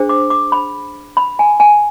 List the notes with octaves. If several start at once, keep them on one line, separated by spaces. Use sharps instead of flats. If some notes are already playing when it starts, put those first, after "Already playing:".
Already playing: D4 G#4 C5
D6
D6
B5
B5
G#5
G#5